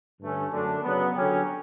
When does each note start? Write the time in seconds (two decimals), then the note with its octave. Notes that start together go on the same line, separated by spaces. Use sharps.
0.20 G2 D3 A3 C#4
0.51 F#2 D3 A3 D4
0.83 C#3 F#3 B3
1.14 D3 F#3 C#4 G4